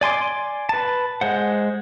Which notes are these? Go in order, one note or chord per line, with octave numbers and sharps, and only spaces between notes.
D5 G#5 C6 D6
B4 A5
G#3 C5 F#5